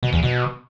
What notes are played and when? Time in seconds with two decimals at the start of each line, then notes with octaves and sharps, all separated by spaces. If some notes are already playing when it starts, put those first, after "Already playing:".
0.03 B2
0.13 E2
0.23 B2